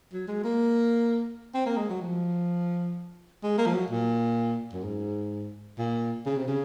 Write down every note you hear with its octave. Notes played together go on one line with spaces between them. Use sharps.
F#3
G#3
A#3
C4
A#3
G#3
F#3
F3
G#3
A#3
F3
F#3
A#2
F#2
G#2
A#2
C#3
C3
C#3